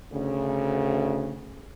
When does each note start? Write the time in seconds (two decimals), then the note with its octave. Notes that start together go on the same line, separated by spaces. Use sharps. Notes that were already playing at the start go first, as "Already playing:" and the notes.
0.12 D2 C#3